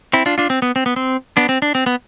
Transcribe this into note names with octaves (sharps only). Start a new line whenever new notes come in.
C4 E4
D4 F4
D4 F4
C4
B3
C4
B3
C4
B3 D4
C4
D4
C4
B3